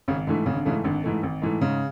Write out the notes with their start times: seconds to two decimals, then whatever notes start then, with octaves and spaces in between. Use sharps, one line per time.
0.08 G#1 C#3
0.27 G#2 D3 E3 A3
0.46 G#1 C#3
0.55 D3
0.65 G#2 C#3 E3 A3
0.84 G#1 D3
1.04 G#2 E3 A3
1.23 G#1
1.42 G#2 E3 A3
1.61 G#2 C#3